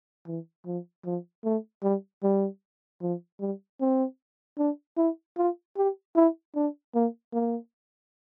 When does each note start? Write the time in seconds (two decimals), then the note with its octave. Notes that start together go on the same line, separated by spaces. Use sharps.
0.27 E3
0.66 F3
1.05 F3
1.45 A3
1.83 G3
2.23 G3
3.02 F3
3.40 G3
3.81 C4
4.58 D4
4.97 E4
5.37 F4
5.77 G4
6.16 E4
6.56 D4
6.95 A#3
7.33 A#3